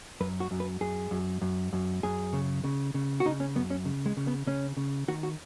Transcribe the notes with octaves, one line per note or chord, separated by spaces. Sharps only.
F#2 B4
F#4
F#2
B4
F#2 G#4
F#2
F#2
F#2
F#2 G#4
C#3
C#3
C#3
F#4
C#3 D#4
C#4
F#2 B3
C#4
C#3
G#3
C#3
B3
C#3 C#4
C#3
D#3 F#4
F#4